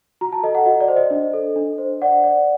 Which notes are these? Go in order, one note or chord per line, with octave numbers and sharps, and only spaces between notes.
F#4 A#5
A5
A4 D#5
F#5
F#4 D#5
D5
C5
D#5
D4
A4
D4
C5
D5 F#5
D5